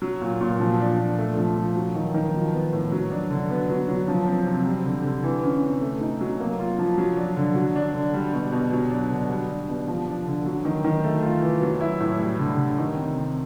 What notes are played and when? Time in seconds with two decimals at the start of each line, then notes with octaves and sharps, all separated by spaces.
0.02 F#3
0.21 A#2
0.41 A#2
0.60 F3
0.79 D4
0.99 A#2
1.18 A3
1.37 F3
1.57 F3
1.76 F#3
1.95 D#3
2.14 D#3
2.34 F3
2.53 B3
2.73 A2
2.92 F#3
3.11 D4
3.31 D3
3.50 B3
3.69 F#3
3.89 F#3
4.08 F3
4.28 C4
4.46 C3
4.65 G3
4.85 D3
5.04 D3
5.24 E3
5.44 C#4
5.63 C3
5.81 A3
6.01 D#4
6.21 F#3
6.40 A#3
6.59 F4
6.79 F3
6.98 F#3
7.17 D4
7.37 D3
7.55 F#3
7.76 D4
7.94 D3
8.14 G3
8.33 B2
8.52 B2
8.72 F#3
8.91 D4
9.10 D3
9.30 G3
9.49 D4
9.69 B2
9.88 F3
10.07 D4
10.27 D3
10.46 F#3
10.65 D#3
10.84 D#3
11.04 A3
11.23 F4
11.42 E3
11.61 F#3
11.81 E4
12.00 A2
12.20 G3
12.39 D3
12.58 D3
12.78 D#3
12.97 C3
13.16 C3